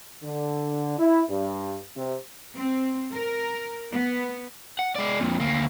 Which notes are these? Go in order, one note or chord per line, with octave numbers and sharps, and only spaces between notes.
D3
E4
G2
C3
C4
A#4
B3
F#5
G#3 D5
F2 A#2
D2 A#3